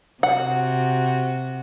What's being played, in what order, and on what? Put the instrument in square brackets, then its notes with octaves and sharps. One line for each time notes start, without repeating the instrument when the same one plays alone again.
[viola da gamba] C3 F#4 [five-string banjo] F#5